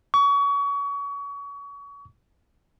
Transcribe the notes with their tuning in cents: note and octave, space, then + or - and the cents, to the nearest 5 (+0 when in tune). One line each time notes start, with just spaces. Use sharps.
C#6 +30